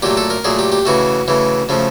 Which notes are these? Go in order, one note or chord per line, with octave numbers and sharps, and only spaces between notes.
A#2 F#3 A3 G4
A4
A#4
A#2 F#3 A3 G#4
G4
G4
C#3 E3 A3 F#4
C#3 E3 A3
C#3 F3 A3